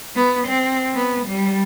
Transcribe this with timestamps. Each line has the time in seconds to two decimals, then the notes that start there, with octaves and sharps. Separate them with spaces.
0.16 B3
0.48 C4
0.94 B3
1.27 G3